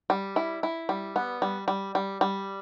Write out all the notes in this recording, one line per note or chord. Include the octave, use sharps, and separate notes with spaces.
G3
E4
E4
G3
B3
G3
G3
G3
G3